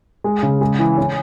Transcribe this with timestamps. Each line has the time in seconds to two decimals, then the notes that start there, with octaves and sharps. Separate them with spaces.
0.24 G#3
0.43 C#3
0.61 G#3
0.79 E3
0.98 C#4